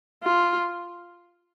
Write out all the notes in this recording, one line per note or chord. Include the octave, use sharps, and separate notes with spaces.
F4